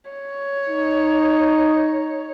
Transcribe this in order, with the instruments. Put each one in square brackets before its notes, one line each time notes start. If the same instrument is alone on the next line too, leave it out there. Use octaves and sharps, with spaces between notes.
[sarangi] C#5
[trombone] D#4